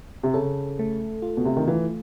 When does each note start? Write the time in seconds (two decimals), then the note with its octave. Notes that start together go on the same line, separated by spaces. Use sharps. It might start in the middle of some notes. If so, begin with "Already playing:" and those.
0.23 C3
0.34 C#3 A4
0.79 A3
1.22 F4
1.37 B2
1.45 C3
1.57 D#3
1.67 E3 F4